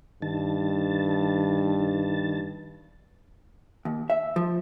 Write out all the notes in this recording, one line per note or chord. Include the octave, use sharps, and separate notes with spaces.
G2 D#3 A5
D#2
E5
F3